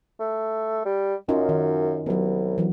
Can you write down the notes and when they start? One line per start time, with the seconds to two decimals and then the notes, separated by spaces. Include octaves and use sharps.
0.20 A3
0.85 G3
1.29 F#2 C#4 D#4 F4
1.49 D#3
2.06 C2 F#3 B3
2.58 E3 F#3